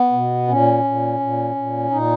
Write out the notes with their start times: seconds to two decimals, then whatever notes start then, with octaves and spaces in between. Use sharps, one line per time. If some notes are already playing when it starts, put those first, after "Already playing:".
Already playing: B3
0.12 B2
0.48 A#2 C#4
0.84 A#2
1.20 A#2
1.55 A#2
1.90 A#2 D#4